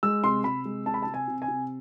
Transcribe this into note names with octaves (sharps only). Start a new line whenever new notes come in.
G#3 E6
C3 C6
C3 B5
G#3
C3 A5
B5
A5
C3
G#5
C3
G#5
C3